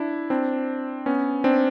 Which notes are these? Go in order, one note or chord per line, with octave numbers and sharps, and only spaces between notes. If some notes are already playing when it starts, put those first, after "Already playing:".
Already playing: D4 E4
C4 D4
B3 C#4
C4 D4